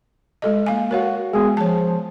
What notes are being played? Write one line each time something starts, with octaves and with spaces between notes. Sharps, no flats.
G#3 A4 D#5
A#3 F5 G#5
F#4 A#4 C#5 F5
G#3 B3 G#4
F3 C#5 A5